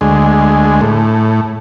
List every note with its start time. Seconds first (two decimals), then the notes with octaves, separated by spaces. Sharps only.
0.01 D2 G#3
0.81 A2